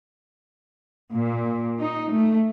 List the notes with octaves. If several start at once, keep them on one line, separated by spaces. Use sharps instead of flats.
A#2
D#4
A3